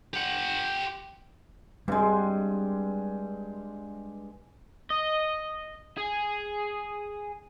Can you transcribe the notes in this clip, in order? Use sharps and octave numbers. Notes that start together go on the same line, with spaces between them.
G4 F#5
G2 G3 G#3 B3 C4
D#5
G#4